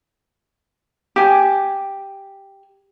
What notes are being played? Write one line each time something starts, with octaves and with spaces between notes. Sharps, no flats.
G4 G#5